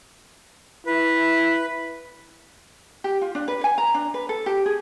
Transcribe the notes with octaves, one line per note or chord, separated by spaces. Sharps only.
E4 B4
G4
F4
D4
B4
G#5
A#5
D4
B4
A4
G4
G#4